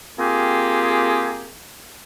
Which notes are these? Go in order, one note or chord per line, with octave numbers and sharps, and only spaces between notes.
A#3 C4 F4 G4 G#4